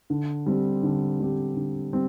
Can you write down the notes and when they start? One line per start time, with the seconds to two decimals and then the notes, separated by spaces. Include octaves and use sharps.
0.10 D3
0.46 G3 C4 G4
0.83 D3
1.20 G3 C4 G4
1.56 D3
1.93 G3 C4